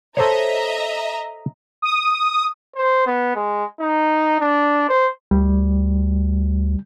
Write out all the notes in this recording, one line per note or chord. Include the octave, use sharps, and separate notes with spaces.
A4 C5 C#5 D#5 E5 A#5
D#6
C5
B3
G#3
D#4
D4
C5
D2 G3